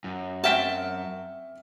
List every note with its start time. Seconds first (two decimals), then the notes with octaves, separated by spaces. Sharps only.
0.04 F#2
0.44 C4 F#4 E5 G5 A5 F6 B6